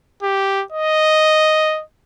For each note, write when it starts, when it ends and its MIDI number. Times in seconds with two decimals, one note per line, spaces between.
0.22 0.63 67
0.72 1.82 75